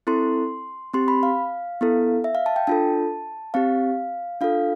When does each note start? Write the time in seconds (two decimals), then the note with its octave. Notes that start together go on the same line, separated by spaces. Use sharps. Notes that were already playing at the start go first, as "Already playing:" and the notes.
0.07 C4 E4 A4 C6
0.93 C4 G4 C6
1.08 B5
1.23 F5
1.81 B3 E4 A4
2.24 E5
2.35 F5
2.46 A5
2.56 G5
2.67 D4 F4 A4 A5
3.54 C4 G4 F5
4.41 D4 F4 A4 F5